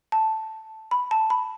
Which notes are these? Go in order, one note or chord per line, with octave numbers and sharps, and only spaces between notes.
A5
B5
A5
B5